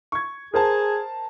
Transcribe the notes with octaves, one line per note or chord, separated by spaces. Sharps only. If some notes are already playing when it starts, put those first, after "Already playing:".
C#6 G#6
G#4 A#4 C5 A5